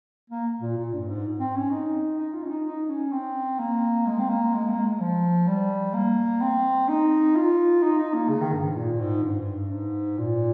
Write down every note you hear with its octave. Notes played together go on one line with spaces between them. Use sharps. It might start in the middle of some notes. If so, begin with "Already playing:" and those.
A#3
A#2
A#2
G2
G#2
C4
C#4
D#4
D#4
F4
C#4
D#4
D#4
C#4
C4
A#3
G#3
C4
A#3
G#3
A#3
G#3
F3
G3
A#3
C4
D#4
F4
D#4
D#4
A#3
C#3
D#3
G2
G#2
A#2
G#2
G2
G#2
A#2